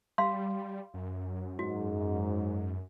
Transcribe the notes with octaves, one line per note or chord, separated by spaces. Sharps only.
G3 F5 C6
F#2
G#2 F#4